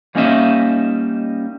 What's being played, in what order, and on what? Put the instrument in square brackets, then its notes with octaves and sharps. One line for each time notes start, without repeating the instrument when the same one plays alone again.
[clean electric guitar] G3 A#3 C#4 D#4 D#5 E5